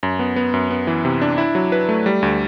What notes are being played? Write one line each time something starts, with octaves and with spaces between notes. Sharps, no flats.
F#2
B3
B3
F#2
B3
E3
C3
D4
E4
F#3
B4
A3
G3
D2